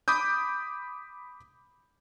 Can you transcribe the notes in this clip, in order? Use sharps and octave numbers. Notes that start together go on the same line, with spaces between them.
B5 D6 D#6 G6